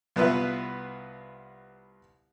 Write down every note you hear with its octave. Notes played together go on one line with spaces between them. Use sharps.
C2 B3 F4 B4 E5